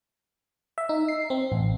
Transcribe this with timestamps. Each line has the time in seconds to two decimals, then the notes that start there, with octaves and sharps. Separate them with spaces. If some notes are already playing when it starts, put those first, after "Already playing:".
0.78 E5
0.89 D#4
1.08 C7
1.30 C4
1.52 A1